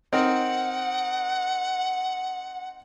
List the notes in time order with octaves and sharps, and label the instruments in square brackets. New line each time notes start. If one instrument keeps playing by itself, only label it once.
[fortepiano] C4 D#4 A#4 [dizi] F#5